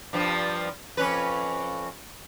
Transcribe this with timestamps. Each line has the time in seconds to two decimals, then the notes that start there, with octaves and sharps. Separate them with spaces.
0.13 G2 F3 G3
0.97 F2 C#4 B4